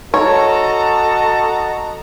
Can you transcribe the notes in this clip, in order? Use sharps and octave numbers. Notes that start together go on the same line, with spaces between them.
F#4 A4 C#5 D#5 A5 A#5